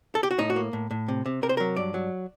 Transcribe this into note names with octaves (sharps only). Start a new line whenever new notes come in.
A4
G4
F#4
A2 D#4
F#4
A#3
A2
A2
C3
C3
C3 A#4
C5
F#3 A#4
G2 D5
F#3